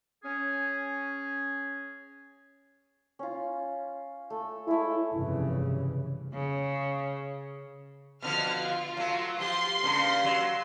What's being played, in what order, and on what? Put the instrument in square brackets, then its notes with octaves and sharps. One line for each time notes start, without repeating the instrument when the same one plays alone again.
[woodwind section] C#4 G#4
[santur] C#4 F4
A3
[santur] G#3 A3 [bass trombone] E4
[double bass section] F1 G2 C#3 E3
[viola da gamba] C#3
[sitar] B2 D3 F3 [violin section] F6
[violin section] F4
[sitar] F#3 A3
[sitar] F3 F4 G4 [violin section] C6
[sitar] G2 C#3 A#3
F#3